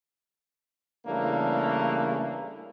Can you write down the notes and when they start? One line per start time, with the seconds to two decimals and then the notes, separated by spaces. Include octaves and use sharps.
1.07 C#3 E3 G3 A3 A#3 D4